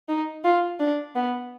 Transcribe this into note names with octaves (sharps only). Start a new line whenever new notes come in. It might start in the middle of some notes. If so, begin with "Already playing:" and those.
D#4
F4
D4
B3